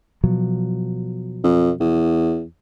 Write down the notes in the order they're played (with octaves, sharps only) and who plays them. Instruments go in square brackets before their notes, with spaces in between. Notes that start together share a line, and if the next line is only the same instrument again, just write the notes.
[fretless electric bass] B2 F3 F#3
[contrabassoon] F2
E2